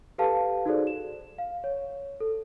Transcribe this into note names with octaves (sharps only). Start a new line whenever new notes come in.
G4 A4 B4 F5 A5
D#4 F#4 G#4 A4 C5 D5
E7
F5
C#5
A4